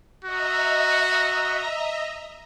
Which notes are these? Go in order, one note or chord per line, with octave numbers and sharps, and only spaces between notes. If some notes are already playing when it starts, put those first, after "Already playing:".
F#4 D#5 E5 A#5